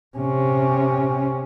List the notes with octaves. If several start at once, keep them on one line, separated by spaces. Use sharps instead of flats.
C3 C#4